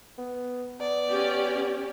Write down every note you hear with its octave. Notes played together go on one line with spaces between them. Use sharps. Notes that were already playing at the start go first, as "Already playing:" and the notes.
B3
B3 D5
C#4 G4